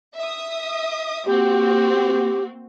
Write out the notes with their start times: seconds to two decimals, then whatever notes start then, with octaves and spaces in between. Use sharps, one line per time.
0.16 E5 D#6
1.26 A#3 C4 F#4 G4